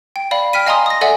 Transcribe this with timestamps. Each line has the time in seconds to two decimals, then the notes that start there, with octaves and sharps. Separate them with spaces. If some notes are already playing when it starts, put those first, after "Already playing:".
0.16 G5
0.31 D5 F5 B5
0.53 G5 F6 B6 D#7
0.66 D#5 F5 G#5 A#5 C6 D#6
0.86 D#6 A#6
1.01 A4 D5 E5 F#5 G#5